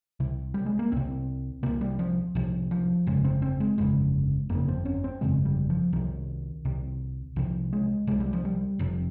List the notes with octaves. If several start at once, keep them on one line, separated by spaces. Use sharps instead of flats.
C2 C3
G3
G#3
A#3
C2 C3 C4
C2 C3 A#3
G3
F3
C2 C3 F3
F3
G1 F2 C#3 G#3
C4
C4
G#3
G1 F2 C#3 G#3
G1 F2 C#3 A#3
C4
C#4
C4
G1 F2 C#3 G#3
G3
F3
C2 C3 D#3
C2 C3
C2 C3 F3
G#3
C2 C3 G#3
G3
F3
G3
F1 F2 C3